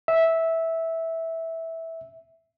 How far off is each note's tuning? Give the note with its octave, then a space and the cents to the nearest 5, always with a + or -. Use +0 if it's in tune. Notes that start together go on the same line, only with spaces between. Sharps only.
E5 -10